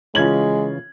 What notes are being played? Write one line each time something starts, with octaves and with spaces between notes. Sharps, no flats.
C#3 E3 G#3 C#4 F4 G#6 F#7